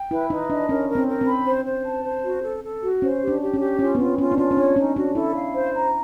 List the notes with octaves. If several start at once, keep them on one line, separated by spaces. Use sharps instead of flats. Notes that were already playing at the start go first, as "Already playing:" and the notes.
Already playing: G5
E4 B4
D#4 B4
D4 D#5
C#4 A#4
A#4
C4
A#4
C4
B5
C5
C5
A5
C5
F#4
A4
A4
F#4
C#4 C5
G4
D4
G4
C#4
G4
C#4 F4
B3
C4 F4
C#4 F4
D4
C#4 F4
C#4
D4 C#5
C#4 D#4
D4 F#4
E4 A4
F5
C5
A#5